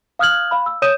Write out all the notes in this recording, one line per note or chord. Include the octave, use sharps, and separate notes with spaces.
F5 D#6 F6 F#6 G#6 F#7
F5 B5
E6
C#5 D#6 G6 D#7 E7